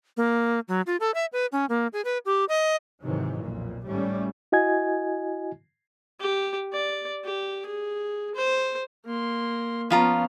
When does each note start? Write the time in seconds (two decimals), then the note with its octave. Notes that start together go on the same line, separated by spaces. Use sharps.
0.17 A#3
0.68 F#3
0.87 F4
1.00 A4
1.15 E5
1.33 B4
1.52 C#4
1.69 A#3
1.93 G#4
2.05 B4
2.26 G4
2.49 D#5
3.04 G#2 C3 D#3 E3 F#3
3.41 B1 F2 A#2
3.86 G#1 A2 G3 A3 C#4
4.52 E4 F#4 D#5 G#5 G#6
6.20 G4
6.73 D5
7.25 G4
7.66 G#4
8.35 C5
9.06 A#3 C6
9.90 F3 B3 C#4 F4 A#5